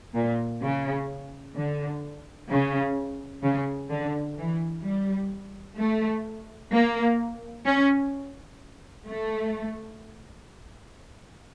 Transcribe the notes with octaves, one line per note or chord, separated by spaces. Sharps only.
A#2
C#3
D3
C#3
C#3
D3
E3
G3
A3
A#3
C#4
A3